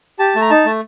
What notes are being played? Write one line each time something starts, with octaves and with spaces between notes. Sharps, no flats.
G4 A5
A3
A#5
D#4 A5
A3